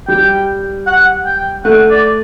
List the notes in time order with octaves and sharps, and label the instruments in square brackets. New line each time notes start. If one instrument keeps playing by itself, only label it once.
[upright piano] G3 [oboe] G5
[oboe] F#5
G5
[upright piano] A3 [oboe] F#5
[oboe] D5